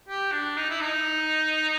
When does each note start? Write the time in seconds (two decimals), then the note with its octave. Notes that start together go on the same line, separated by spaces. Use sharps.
0.08 G4
0.32 D4
0.57 D#4
0.69 E4
0.80 D#4